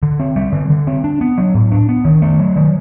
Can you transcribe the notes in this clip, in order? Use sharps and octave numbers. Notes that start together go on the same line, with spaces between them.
D3
C4
G3
D3
D3
C4
D4
B3
F#3
A2
D4
B3
D#3
A3
F#3
D#3